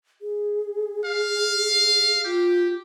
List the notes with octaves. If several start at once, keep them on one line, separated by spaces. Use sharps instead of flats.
G#4
F5
F4 G4